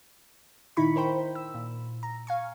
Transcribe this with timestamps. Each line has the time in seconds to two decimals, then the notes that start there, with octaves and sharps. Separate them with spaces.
0.77 A#2 D#3 D#4 E4 B5 C#6
0.96 A#4 C5 G5 B5
1.35 E6
1.54 A#2
2.03 A#5
2.27 F5 G#5 C#6